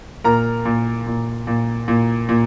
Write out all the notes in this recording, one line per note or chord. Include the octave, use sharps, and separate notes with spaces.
A#2 A#4 A#5
A#2
A#2
A#2
A#2
A#2